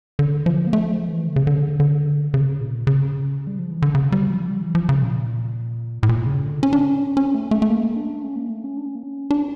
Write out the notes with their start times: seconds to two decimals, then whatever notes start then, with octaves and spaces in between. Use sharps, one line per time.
0.19 D3
0.46 F3
0.67 A#3
0.73 A3
0.91 F3
1.09 E3
1.27 D3
1.36 C#3
1.47 D3
1.80 D3
2.34 C#3
2.61 A#2
2.87 C#3
3.47 G3
3.59 F3
3.71 E3
3.82 D3
3.95 C#3
4.12 G3
4.31 F3
4.48 G3
4.62 E3
4.75 F3
4.89 C#3
5.02 A#2
6.03 A2
6.09 A#2
6.26 C#3
6.45 D3
6.63 C#4
6.73 D4
6.83 C#4
7.17 C#4
7.34 A3
7.51 A3
7.62 A3
7.70 A#3
7.97 D4
8.23 C#4
8.36 A#3
8.50 A3
8.64 C#4
8.77 D4
8.86 C#4
8.95 A#3
9.03 C#4
9.31 D4